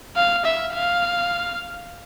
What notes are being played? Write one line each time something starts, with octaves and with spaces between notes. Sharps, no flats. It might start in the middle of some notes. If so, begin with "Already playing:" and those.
F5
E5
F5